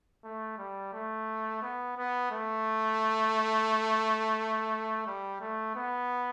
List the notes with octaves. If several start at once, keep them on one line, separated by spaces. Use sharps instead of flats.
A3
G3
A3
B3
B3
A3
G3
A3
B3